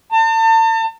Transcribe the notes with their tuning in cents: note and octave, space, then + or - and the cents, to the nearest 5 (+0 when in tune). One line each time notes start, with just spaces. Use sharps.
A5 +40